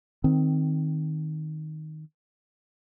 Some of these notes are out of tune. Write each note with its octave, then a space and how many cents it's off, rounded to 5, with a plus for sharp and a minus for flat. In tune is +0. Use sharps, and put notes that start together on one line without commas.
D#3 +0 C4 +0